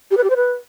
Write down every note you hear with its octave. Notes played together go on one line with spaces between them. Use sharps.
G4
B4
G4
C5
B4